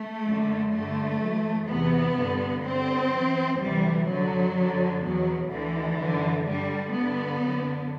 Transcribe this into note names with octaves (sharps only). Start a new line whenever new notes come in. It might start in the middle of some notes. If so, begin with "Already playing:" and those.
Already playing: A3
F#2 D3
G2 D3 A3
F#2 E3
E2 C3 E3 B3
G2 D3
G2 D3 C4
F#2 E3
D2 C3 E3 G3
F#2 D3 F#3
F#2 D3
E2 B2 F#3
D2 D3 E3
F#2 D3
G2 D3 G3
G2 D3 B3
F#2 D3